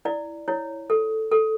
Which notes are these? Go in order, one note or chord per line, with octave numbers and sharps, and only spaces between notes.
E4 D5
E4 C#5
A4
A4